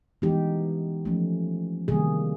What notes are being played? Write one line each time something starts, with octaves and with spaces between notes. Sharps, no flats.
E3 G#3 B3 D#4 G4
F3 A3 C#4
C3 D#3 G3 A#3 G#4